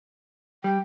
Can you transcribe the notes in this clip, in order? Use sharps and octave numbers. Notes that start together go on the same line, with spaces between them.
G3 G5